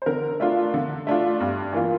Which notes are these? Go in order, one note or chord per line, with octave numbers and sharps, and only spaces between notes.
C5
D3 A#4
A3 D4 F4
D3
A3 D4 F4
G2
E3 A#3 F4